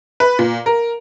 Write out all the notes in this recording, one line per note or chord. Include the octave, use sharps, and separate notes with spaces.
B4
A#2
A#4